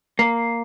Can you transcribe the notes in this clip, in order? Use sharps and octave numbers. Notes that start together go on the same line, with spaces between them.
A#3